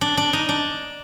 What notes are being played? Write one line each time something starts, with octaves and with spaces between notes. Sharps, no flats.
D4
D4
D#4
D4